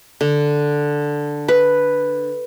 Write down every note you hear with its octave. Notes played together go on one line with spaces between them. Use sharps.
D3
B4